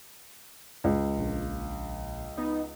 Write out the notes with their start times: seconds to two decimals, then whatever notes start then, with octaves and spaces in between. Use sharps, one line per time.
0.84 C#2
1.17 A#1
2.37 B3 D#4